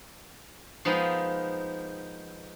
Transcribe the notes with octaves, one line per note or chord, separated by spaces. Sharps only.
F3 G#3 B3 D#4 A#4 B4